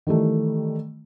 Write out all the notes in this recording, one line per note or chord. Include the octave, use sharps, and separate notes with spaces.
D#3 E3 G3 A3